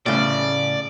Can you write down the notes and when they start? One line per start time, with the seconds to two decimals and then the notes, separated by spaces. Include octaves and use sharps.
0.06 A2 C#3 D5